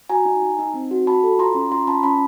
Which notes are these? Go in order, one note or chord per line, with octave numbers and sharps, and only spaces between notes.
F#4 G#5 A#5
D#4
D#4
D#4
C4
F#4
F#4 A5 B5
A4
F4 A#5 C6
C#4
F4 A#5 C6
C#4 A5 B5
C#4 A5 B5